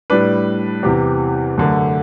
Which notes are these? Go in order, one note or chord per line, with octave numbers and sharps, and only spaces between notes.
A2 G3 D4 B4
E2 C3 E3 G4
F#2 D3 A3